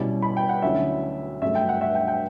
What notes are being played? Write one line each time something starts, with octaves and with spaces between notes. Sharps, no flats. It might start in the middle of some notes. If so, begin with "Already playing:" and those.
Already playing: B2 G3 C#4 E4
B5
G5
F#5
D2 D3 F#3 C#4 E4 E5
G2 F#3 A3 E5
G5
F#5
E5
G5
G5